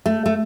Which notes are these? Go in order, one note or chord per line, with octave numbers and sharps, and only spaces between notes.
A3
A3